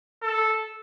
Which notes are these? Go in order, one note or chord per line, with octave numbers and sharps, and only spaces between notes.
A4